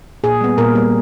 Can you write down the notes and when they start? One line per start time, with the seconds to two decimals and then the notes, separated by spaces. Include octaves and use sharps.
0.24 A#2 G#4
0.41 G3 B3
0.58 A#2 A#4
0.75 G3 B3